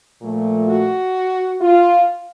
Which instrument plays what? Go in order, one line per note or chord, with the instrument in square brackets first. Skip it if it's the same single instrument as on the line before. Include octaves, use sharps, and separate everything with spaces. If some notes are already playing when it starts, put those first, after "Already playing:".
[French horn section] A#2 F3 A3
F#4
F4